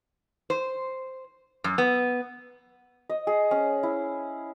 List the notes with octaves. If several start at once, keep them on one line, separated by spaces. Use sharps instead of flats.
C5
F#2
B3
D#5
G#4
C#4
E4